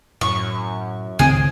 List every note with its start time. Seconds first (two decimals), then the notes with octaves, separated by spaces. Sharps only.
0.21 F#2 A2 C#6
1.19 C#2 A2 D#3 C4 G#4